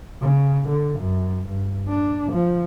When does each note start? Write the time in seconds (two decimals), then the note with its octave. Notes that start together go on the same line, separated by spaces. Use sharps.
0.22 C#3
0.68 D3
0.99 F#2
1.47 G2
1.88 D4
2.32 F3